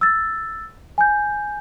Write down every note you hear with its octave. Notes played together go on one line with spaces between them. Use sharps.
E6 A6
G#5 G6